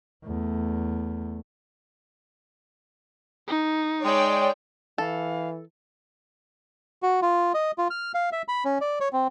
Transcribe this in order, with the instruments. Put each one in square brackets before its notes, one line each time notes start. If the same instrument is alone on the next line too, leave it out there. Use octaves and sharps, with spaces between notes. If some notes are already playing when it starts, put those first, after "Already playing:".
[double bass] E2 A3
[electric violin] D#4
[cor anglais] G#3 [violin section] C#5 D5 G5
[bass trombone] E3 [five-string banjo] A4 [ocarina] F5
[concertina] F#4
F4
D#5
F4
F6
F5
E5
B5
C#4
D5
C#5
C4